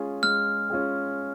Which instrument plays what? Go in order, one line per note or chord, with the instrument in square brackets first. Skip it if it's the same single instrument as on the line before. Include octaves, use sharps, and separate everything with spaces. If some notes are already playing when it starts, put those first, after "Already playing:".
Already playing: [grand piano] G#3 C#4 F4 G#4
[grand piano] G#3 [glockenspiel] F6
[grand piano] C#4 F4 G#4